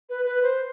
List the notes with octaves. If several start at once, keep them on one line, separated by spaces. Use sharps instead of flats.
B4
B4
C5